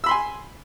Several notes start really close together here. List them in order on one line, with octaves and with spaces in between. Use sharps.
E6 B5 C6 G#5